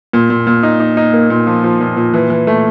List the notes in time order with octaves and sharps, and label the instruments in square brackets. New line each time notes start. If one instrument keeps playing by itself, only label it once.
[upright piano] A#2
A#2
A#2
D#4
D#4
D#4
A#3
A#2
F3
F3
A#2
A#2
E3
E3
A3